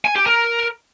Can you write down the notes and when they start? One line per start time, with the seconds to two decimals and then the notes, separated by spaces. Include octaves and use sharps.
0.05 G#5
0.16 G4
0.27 A#4